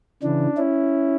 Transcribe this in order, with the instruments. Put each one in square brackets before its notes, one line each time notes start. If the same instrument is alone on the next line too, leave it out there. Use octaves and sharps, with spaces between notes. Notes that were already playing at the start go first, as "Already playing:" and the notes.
[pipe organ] C#3 E3 D4
C#4 E4